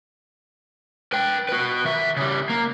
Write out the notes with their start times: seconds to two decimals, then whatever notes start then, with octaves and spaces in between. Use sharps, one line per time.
1.13 B4 G5
1.49 F#4 B4
1.85 D#3 E5
2.17 C#3 G3
2.50 A#3